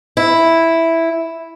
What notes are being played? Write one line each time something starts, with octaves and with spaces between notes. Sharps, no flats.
E4